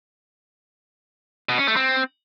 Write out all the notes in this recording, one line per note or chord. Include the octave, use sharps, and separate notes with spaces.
B2
C#4
A3
C4